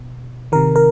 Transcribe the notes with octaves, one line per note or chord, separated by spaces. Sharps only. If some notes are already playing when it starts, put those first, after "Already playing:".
Already playing: B2
C3 D#3 A#4
A#4